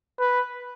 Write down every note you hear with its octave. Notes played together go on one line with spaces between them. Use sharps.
B4